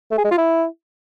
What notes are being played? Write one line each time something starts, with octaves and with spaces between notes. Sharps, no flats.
A3
G#4
G#3
F4
E4